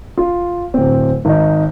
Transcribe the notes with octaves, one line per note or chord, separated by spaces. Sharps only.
F4
D1 C4
G#1 D#4